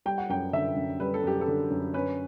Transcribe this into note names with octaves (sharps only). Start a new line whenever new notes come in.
G3 G5
F#5
F#2 G5
D3 E5
F#2
G3 B4
A4
F#2 G4
A4
D3
F#2
C#4 B4